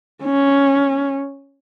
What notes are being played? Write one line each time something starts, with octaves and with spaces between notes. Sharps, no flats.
C#4